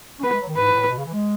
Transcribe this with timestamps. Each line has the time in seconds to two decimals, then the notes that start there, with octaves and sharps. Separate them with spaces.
0.19 C#4
0.23 B3 B4
0.32 G#3
0.40 F#3
0.48 D#3
0.56 G#2 B4
0.73 A2
0.89 B2
0.97 C#3
1.05 E3
1.13 G#3